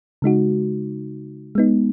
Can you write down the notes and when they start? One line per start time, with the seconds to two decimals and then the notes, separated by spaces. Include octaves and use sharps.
0.22 C#3 G#3 D#4 F#4
1.55 G#3 B3 D#4